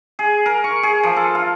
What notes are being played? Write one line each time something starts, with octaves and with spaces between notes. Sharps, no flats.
G#4
A#4
C#6
G#4
F3
A4
F4